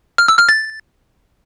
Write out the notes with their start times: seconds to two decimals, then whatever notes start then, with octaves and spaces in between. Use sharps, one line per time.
0.18 F6
0.28 E6
0.38 F6
0.49 A6